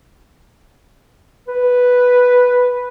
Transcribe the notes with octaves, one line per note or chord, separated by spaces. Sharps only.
B4